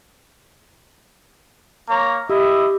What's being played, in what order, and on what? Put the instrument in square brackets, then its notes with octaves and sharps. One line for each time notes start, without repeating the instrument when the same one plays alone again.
[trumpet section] A#3 C#5 A#5
[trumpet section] E4 D#5 E5 [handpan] G4